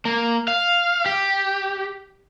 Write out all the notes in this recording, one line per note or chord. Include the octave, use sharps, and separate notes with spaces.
A#3
F5
G4